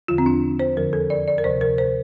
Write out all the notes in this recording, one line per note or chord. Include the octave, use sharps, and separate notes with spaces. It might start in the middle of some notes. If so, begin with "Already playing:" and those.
E2 D3 F3 F4
C4
D4
C5
F2 D3 F3 A#4
A4
D5
D5
A#4
D2 C3 F3 C5
A#4
C5